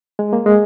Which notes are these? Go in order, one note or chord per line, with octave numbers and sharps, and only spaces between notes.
G#3
A#3
G#3